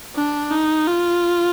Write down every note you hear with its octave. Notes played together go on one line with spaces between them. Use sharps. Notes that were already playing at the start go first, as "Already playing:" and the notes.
D4
D#4
F4